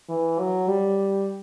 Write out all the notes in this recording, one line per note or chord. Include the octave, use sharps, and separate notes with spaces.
E3
F#3
G3